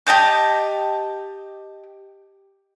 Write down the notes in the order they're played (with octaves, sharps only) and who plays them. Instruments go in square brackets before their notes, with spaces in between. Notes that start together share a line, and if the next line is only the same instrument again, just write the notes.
[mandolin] G4 D#5 A5 G6